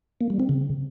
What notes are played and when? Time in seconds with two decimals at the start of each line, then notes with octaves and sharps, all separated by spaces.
0.21 A#3
0.30 G3
0.40 C4
0.49 C#3